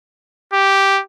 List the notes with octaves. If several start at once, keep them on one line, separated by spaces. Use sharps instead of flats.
G4